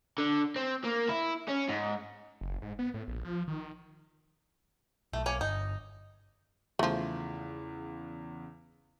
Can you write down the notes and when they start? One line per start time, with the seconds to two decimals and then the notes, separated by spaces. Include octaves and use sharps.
0.18 D3
0.56 C4
0.84 A#3
1.09 E4
1.48 C#4
1.69 G#2
2.41 F#1
2.62 G#2
2.79 B3
2.94 A2
3.08 A#1
3.25 F3
3.48 D#3
5.13 B1 A3
5.26 A#3 C#5 G#5
5.41 G1 D#4
6.79 E2 C#3 F3 A3